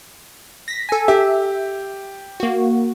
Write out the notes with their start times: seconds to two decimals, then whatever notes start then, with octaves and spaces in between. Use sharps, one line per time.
0.68 A#6 B6
0.89 A4 G#5
1.08 G4 E5
2.40 A#3 F#4